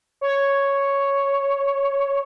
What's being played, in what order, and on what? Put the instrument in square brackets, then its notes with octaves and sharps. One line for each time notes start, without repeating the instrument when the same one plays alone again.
[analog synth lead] C#5